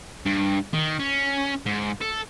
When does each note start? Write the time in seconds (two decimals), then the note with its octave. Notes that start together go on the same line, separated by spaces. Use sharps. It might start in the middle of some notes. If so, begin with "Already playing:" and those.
0.26 G2
0.74 D#3
1.00 C#4
1.66 G#2
2.01 A4